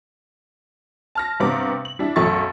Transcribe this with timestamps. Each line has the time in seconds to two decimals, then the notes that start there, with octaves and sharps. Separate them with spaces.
1.15 A5 F6 A#6
1.40 G2 C3 G3 B3 A#5 D6
1.85 F#7
1.99 G3 D4 E4
2.16 B1 F#2 F#3 A3 C#6 A6